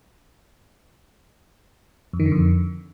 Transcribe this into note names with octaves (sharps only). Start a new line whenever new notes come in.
F2
D#3
D3
F2